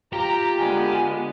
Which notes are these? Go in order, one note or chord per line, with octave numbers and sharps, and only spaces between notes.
F4 G4 A#5
D3 G#3 B3 G#5